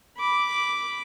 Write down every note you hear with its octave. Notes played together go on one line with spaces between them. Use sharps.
B5 D6